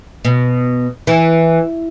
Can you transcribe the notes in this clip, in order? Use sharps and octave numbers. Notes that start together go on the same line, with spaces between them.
B2
E3